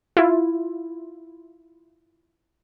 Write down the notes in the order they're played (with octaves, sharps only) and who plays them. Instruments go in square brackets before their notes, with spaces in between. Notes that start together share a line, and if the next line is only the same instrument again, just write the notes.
[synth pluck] E4 F4